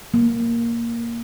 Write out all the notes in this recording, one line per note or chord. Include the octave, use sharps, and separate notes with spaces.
A#3